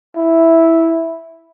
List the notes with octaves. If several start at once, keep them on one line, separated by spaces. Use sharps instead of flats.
E4